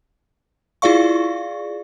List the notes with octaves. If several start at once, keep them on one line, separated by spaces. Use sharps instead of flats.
E4 F4 G#4 D5 F5 C#6